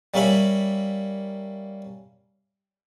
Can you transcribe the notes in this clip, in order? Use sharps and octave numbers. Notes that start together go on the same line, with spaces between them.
G3 A#3 C#4 E5 B5